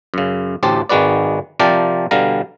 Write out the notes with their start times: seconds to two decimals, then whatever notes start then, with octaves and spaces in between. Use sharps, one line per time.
0.14 F#2 C#3
0.63 A1 D2 A2 G4 C5 A5
0.89 G#1 D#3 G#3 F#4 B4 D5
1.59 C3 F3 A#4 D5 G5 A5
2.11 B2 D3 G3 F5 A#5